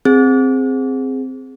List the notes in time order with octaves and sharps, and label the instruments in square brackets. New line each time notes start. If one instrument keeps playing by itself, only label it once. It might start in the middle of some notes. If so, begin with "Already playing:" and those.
[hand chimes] C4 G#4